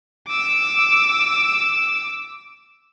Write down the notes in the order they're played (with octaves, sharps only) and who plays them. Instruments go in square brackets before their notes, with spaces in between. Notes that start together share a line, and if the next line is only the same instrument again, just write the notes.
[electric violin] D6 E6